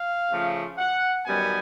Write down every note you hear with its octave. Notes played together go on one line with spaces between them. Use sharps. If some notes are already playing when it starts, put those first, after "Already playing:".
Already playing: F5
C#3 F3 A3
F#5
F#2 D#3 G3 B3 G#5